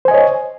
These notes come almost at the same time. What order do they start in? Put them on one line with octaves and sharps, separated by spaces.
C5 G#5 D#5 C#5